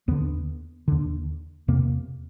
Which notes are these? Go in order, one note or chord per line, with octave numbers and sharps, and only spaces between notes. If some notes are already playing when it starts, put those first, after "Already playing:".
D#2 D3 B3
D#2 D3
E2 C3 A#3